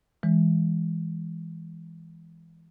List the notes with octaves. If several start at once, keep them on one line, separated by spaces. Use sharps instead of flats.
E3 G#3